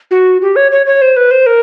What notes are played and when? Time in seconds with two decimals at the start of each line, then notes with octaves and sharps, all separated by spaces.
0.11 F#4
0.42 G4
0.56 C#5
0.72 C#5
0.86 C#5
1.02 C5
1.17 B4
1.31 C5
1.46 A#4